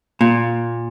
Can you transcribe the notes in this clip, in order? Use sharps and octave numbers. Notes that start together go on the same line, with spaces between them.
A#2